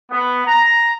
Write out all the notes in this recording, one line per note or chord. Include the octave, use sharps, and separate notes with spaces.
B3
A#5